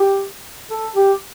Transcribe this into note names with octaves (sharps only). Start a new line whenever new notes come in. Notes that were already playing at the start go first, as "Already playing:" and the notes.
Already playing: G4
A4
G4